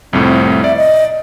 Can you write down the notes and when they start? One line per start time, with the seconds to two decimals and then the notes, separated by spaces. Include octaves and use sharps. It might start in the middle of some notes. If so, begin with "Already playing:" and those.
0.13 C2 F2 A2 C4
0.64 D5 E5
0.77 D#5